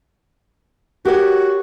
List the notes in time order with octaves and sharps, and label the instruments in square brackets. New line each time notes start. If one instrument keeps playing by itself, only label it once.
[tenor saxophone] F#4 [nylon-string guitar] G4 A#4 C#5